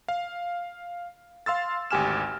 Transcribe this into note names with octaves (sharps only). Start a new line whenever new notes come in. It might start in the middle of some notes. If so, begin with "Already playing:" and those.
F5
F5 C6 E6 A6
G#1 D2 G4 G#5 F6 E7